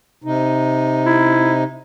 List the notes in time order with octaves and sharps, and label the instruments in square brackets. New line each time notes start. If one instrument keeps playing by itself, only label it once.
[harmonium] C3 D#4
[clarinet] E4